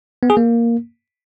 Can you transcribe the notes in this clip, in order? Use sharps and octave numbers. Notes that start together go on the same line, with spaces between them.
B3
G#4
A#3